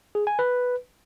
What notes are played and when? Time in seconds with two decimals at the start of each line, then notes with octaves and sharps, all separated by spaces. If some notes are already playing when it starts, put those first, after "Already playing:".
0.15 G#4
0.27 G#5
0.39 B4